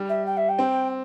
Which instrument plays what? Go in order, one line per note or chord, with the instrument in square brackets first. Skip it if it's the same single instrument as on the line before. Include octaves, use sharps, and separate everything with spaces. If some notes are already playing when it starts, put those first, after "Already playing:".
Already playing: [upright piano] G3
[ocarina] E5
G5
E5
G5
[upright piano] C4